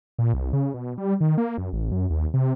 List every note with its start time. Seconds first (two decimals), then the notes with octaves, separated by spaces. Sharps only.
0.19 A#2
0.34 C2
0.53 C#3
0.74 B2
0.98 G3
1.21 D#3
1.38 A#3
1.58 F#2
1.73 A1
1.91 F#2
2.10 D#2
2.34 C3